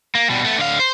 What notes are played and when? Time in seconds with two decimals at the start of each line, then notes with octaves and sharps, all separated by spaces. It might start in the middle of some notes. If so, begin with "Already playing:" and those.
0.15 A#3
0.30 B2 G3
0.44 A3 B3
0.58 D3 F5
0.79 C5